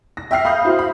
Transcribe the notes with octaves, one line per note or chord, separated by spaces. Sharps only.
A#6
E5 G5 F6 C7
F5 B5 D#6 F6 G6
E4 F#4 C5
B5